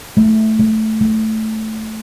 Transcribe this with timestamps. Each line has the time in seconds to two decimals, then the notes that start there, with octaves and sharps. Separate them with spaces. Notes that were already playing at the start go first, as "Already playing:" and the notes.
0.17 A3
0.59 A3
1.01 A3